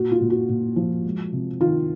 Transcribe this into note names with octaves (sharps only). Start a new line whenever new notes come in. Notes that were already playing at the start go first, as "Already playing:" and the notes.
Already playing: A#2 F#4
F4
A#2
F#4
A#2
F3
G#3
C3
D#3 F4